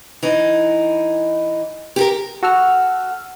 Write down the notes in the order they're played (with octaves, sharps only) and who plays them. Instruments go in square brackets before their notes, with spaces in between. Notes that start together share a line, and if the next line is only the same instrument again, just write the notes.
[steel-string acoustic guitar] E3 D#4
G4 A4 A#4
[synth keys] F#4 A4 F#5 E6 F6